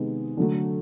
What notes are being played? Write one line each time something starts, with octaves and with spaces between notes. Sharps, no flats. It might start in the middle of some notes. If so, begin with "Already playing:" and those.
Already playing: C3 D#3 G#3 B3
D3 F#3 A3